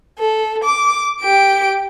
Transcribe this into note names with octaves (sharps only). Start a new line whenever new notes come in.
A4
D6
G4 D7